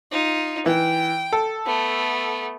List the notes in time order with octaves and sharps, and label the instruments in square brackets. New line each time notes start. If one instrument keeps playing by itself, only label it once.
[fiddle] D#4 F4
[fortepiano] E3 [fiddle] G5
[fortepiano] A4
[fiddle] A3 B3